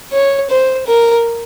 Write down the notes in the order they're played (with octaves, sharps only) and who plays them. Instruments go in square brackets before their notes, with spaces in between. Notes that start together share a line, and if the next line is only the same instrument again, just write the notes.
[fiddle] C#5
C5
A#4